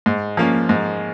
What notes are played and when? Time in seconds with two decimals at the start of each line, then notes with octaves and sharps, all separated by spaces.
0.06 G#2
0.37 F3 A#3 C#4
0.69 G#2